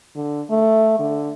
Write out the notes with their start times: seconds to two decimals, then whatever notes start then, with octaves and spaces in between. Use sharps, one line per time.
0.16 D3
0.50 A3
0.99 D3